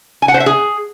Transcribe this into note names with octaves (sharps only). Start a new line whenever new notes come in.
G#5
F#5
C5
E5
G#4